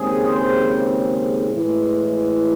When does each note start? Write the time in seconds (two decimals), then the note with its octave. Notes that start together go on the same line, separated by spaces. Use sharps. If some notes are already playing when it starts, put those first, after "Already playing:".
Already playing: D#2 C#3 G#3 C4 G#4
0.28 C5
1.49 A2 E3 G#3